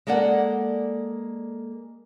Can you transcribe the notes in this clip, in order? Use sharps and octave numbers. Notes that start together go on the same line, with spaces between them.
G#3 A#3 A4 D5 F#5